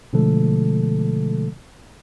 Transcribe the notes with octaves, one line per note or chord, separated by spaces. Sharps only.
B2 D3 F3 G#3 A3 A4